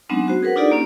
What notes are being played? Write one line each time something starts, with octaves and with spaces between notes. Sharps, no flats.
F#3 G#3 B3 C4 D4 D#4
F#4 C5
G#4 A#4 B4 F#5
D4 D#4 F4 G4 A4 D5
A#3 C#4